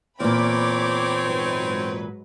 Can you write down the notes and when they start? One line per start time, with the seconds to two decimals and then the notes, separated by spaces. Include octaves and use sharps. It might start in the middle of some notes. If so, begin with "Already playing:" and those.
0.20 E2 A#2 C4 C#5 B5 D6
1.26 G#2 F#3 B4